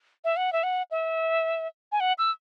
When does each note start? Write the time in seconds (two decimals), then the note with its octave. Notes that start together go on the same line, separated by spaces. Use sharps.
0.24 E5
0.37 F#5
0.53 E5
0.63 F#5
0.91 E5
1.92 G#5
2.00 F#5
2.18 E6